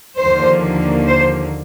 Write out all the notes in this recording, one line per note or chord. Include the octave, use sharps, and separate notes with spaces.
D#2 D3 F3 A#3 C5
C5